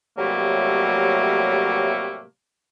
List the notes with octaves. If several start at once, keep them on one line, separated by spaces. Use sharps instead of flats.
A2 C3 F#3 G3 A3 A#3